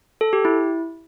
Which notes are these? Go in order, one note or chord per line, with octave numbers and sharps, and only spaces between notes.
A4
G4
E4